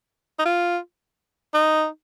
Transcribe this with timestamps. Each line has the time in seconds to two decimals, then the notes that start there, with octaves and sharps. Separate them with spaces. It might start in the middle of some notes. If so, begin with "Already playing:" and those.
0.39 D#4
0.45 F4
1.54 D#4